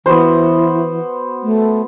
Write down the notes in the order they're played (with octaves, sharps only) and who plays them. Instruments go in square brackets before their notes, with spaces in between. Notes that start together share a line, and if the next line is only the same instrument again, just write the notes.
[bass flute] E3 [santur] B3 F#4 C5
[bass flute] A3